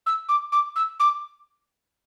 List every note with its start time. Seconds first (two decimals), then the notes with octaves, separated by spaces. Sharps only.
0.06 E6
0.29 D6
0.52 D6
0.76 E6
1.00 D6